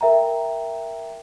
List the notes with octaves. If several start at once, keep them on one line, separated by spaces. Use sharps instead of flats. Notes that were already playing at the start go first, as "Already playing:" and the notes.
A#4 E5 G5 A#5